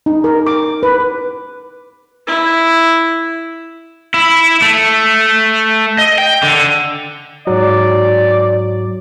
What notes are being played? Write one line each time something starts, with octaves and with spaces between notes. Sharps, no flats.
D#4
A#4
D6
B4
E4
E4
A3
D#5
G5
D3
G#2 F#3 D5